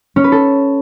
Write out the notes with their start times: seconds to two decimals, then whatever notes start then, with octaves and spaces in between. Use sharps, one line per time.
0.16 C#4
0.24 B4
0.32 A4